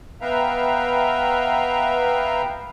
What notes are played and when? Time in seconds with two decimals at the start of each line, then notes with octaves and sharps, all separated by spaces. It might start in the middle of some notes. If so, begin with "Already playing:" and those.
0.21 B3 B4 E5 F5 G5 A#5